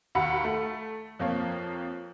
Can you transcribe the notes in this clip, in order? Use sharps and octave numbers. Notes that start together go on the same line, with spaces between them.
D#2 F#4 F#5 A#5 B5 C#7
A3
F2 F3 A#3 C#5